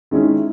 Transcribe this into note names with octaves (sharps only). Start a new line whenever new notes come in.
D#3 G#3 C#4 E4